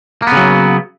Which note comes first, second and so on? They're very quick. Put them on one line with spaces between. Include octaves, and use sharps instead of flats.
A#3 B3 C#3 F#3